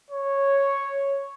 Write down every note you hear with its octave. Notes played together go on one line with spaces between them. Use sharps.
C#5